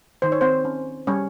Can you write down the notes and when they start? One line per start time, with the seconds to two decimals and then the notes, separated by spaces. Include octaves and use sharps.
0.22 D#3 C5
0.32 C#5
0.41 C4 C5
0.65 C#4
1.07 G3 C#4 C#5